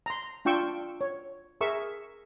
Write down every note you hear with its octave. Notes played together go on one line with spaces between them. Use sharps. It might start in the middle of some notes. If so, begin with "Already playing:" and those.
A#5 C6
D4 F4 G5 C#6 E6
C#5
G#4 A#4 E5 C#6 E6